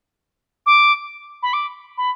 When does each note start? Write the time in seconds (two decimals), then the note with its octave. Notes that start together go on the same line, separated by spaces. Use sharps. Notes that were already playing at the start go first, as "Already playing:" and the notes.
0.66 D6
1.42 B5
1.53 D6
1.97 B5